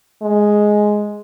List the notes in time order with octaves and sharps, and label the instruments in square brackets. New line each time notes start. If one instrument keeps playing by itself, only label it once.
[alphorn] G#3